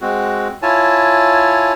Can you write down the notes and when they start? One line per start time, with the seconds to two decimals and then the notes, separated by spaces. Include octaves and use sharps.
0.01 G#3 C4 F#4
0.62 E4 F4 C#5 G#5 A5